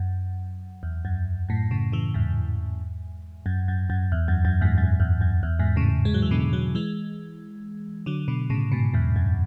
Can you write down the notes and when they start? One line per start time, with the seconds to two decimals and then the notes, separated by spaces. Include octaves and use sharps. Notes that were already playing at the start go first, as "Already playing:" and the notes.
Already playing: F#2
0.83 E2
1.05 F#2
1.49 F#2 A2
1.71 A2 C#3
1.92 C#3 E3
2.14 E2 G#2
3.46 F#2
3.68 F#2
3.90 F#2
4.12 E2
4.28 F#2
4.45 F#2
4.61 E2 G#2
4.78 F#2
5.00 E2
5.21 F#2
5.43 E2
5.59 E2 G#2
5.76 A2 C#3
6.05 G#3
6.14 F#3
6.22 E3
6.31 B2 D3
6.53 D3 F#3
6.75 E3 G#3
8.06 D3 F#3
8.28 B2 D3
8.50 A2 C#3
8.72 G#2 B2
8.94 E2 G#2
9.16 F#2